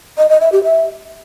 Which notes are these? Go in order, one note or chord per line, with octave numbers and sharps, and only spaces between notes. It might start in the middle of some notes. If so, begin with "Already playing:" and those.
D#5
D#5
E5
G4
E5